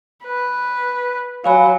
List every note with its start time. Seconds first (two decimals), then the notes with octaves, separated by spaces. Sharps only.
0.25 B4
1.44 F#3 F5 G#5 B5